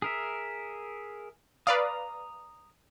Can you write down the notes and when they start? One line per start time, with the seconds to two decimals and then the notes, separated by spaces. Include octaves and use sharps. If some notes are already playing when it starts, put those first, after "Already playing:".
0.02 G#4 A#4 E5
1.67 B4 D5 F5 A#5 D#6